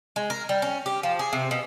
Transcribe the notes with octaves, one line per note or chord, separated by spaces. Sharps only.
G#3
A#4
G3
C#4
G4
F3
G#4
C3
B2